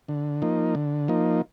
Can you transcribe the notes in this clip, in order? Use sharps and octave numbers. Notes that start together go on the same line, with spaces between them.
D3
F3 A#3 D#4
D3
F3 A#3 D#4